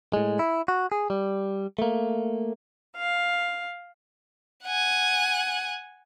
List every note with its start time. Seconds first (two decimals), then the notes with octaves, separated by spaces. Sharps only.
0.14 A2 G#3
0.39 E4
0.68 F#4
0.92 G#4
1.10 G3
1.79 A3 A#3
2.96 F5
4.64 F#5 G#5